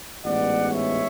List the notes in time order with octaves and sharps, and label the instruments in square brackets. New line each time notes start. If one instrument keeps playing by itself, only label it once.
[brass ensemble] A1 G#2 G#3 B3 D5 F#5
C#5 E5